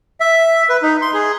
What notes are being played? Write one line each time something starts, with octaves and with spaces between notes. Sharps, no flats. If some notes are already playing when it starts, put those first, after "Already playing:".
E5
B4
D#4
C6
G#4